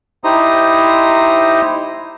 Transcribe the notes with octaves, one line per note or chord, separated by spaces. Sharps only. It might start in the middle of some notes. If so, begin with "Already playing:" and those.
D#4 E4 G4 C5 A#5 D#6